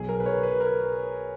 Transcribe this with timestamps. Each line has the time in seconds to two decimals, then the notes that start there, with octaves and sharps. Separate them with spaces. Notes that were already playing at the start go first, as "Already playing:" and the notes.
Already playing: B1 B2 F#3 G#4
0.09 A#4
0.20 B4
0.26 C#5
0.43 B4
0.61 A#4